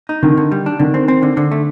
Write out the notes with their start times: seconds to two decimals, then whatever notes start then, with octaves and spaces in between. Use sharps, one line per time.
0.09 D#4
0.23 D3 D#3
0.37 D3
0.51 G3
0.66 D4
0.79 D3 D#3
0.94 C4
1.08 C4
1.23 D3
1.37 D3
1.52 A3